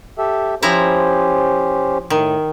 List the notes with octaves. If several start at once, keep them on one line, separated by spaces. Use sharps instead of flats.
G4 A4 E5
F3 C#4 E4 G4 C5 A#5
A2 D#3